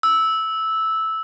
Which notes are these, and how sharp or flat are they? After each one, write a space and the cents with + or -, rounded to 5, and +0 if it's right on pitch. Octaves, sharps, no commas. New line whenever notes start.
E6 -10